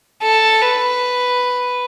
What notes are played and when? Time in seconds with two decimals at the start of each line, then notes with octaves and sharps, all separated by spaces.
0.23 A4
0.62 B4